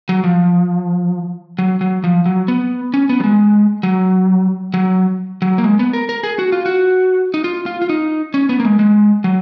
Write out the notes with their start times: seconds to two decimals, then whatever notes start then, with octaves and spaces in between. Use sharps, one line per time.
0.09 F#3
0.24 F3
1.59 F#3
1.81 F#3
2.04 F3
2.26 F#3
2.48 B3
2.94 C#4
3.09 B3
3.20 F#3
3.24 G#3
3.83 F#3
4.74 F#3
5.42 F#3
5.58 A#3
5.64 G#3
5.79 B3
5.93 A#4
6.09 A#4
6.23 G#4
6.39 F#4
6.52 F4
6.66 F#4
7.34 D#4
7.44 F4
7.66 F4
7.82 F4
7.90 D#4
8.34 C#4
8.49 B3
8.60 A#3
8.65 G#3
8.79 G#3
9.24 F#3